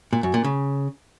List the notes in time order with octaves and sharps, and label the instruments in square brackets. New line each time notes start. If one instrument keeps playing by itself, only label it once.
[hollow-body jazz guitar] A#2
F#2
A#2
C#3